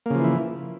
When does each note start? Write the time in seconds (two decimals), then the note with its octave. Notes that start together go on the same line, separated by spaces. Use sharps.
0.06 A#3
0.10 C#3
0.15 F3
0.20 E3
0.24 E4